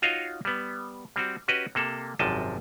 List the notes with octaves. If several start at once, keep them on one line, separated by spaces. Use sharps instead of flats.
D#4 F4 F#4 C#5 D#5 F5
G3 B3
G3 C4 F#4
C#4 F#4 G4 B4 D#5
C3 A#3 A4
G#1 F#2 C3 F3 D#5 A5